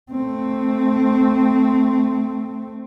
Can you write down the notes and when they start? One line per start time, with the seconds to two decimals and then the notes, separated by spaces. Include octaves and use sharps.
0.11 A3 C4